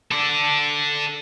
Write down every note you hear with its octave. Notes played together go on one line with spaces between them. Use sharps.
A4 D5